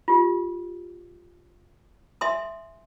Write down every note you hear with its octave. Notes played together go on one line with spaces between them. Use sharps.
F4 G4
D#5 E5 G#5 C6 D#6